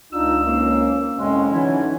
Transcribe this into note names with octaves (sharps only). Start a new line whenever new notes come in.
C#2 D4 D#4 F4 E6
D#3 A#3 C4 C#4
C2 F2 G#3 C#4
D3 E3 F#3 D#4 E4